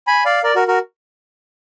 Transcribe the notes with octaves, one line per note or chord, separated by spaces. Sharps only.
G#5 B5
D5 F5
A#4 D5
F#4 A#4
F#4 A#4